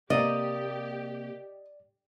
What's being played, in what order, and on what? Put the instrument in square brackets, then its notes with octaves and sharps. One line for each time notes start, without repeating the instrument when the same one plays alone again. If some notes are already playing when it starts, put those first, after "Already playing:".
[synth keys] C3 A#3 [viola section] G4 [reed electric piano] D5 [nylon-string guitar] D#5